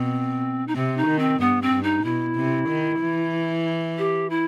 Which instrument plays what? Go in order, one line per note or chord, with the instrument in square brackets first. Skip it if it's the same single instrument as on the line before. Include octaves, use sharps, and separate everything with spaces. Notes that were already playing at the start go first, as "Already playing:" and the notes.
Already playing: [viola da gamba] B2 [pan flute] C4
[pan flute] D#4
[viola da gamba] C3 [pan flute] C4
[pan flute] D#4
[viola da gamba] D#3
[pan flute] C4
[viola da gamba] G2 [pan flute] B3
[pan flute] C4
[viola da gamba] G2
[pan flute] D#4
[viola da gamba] B2 [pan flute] E4
[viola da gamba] C3
D#3
E3
[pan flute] G4
E4